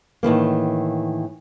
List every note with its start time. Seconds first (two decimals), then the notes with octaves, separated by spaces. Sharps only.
0.23 A2 D#3 E3 A#3